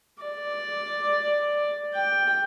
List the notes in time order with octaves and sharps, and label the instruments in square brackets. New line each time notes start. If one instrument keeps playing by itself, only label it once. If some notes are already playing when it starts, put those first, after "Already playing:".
[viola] D5
G5